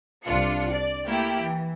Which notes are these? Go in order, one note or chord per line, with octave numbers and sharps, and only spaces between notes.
C2 D4 F4 C#7
D5
A3 A#3 E4 G4
E3